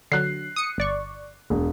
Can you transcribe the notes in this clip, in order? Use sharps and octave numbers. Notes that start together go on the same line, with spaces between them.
D3 F#3 F#6 C7
D#6 C#7
G1 D5 C#6
E1